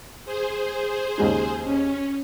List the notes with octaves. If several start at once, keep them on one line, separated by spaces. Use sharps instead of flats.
G#4 C5
D#2 C#3 G#3 D#4
C#4